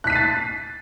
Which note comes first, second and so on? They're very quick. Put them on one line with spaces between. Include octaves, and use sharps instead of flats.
F#6 B6 D#7 C7 A6